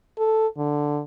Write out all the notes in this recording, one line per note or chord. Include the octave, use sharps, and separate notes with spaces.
A4
D3